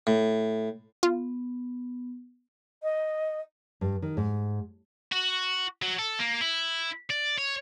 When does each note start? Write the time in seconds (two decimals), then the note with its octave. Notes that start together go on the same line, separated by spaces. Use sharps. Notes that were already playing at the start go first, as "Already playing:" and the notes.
0.07 A2
1.03 B3 F4
2.83 D#5
3.81 G2
4.02 D#3
4.17 G#2
5.12 F#4
5.82 F#3
5.99 A4
6.19 A#3
6.41 E4
7.10 D5
7.38 C#5